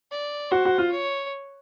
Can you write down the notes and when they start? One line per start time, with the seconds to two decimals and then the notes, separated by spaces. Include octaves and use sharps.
0.11 D5
0.51 F#4 C5
0.65 F#4
0.78 F4
0.91 C#5